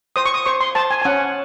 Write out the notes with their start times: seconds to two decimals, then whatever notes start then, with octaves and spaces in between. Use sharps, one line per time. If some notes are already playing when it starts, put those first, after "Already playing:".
0.16 C5 D#6
0.26 C#6
0.34 D#6
0.46 C5 C#6
0.61 C6
0.75 C5 A5
0.91 G#5
1.02 G#5
1.05 C#4 F#5